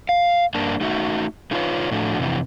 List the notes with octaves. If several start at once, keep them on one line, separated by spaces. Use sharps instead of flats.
F5
G2 A#3 D4 A5
A3 D#4 F#4 E5
A3 D#4 F4 A4 B4 C#5
A2 F3 A3 D4 F#4
F2 C3 E3